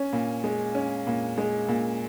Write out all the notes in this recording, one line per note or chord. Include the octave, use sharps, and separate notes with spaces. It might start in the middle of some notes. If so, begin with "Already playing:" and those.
Already playing: C#4
A#2
G#3
C#4
A#2
G#3
A#2